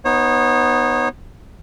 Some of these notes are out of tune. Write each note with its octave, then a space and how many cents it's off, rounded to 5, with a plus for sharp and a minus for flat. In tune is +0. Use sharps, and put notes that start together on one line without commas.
B3 +0 D#4 +0 C#5 -35